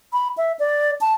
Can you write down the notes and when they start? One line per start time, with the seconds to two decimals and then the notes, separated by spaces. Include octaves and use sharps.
0.13 B5
0.38 E5
0.59 D5
1.01 A5